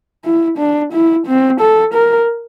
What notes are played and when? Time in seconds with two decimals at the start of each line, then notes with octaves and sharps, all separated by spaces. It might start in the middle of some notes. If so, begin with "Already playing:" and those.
0.24 E4
0.58 D4
0.92 E4
1.27 C4
1.60 A4
1.93 A#4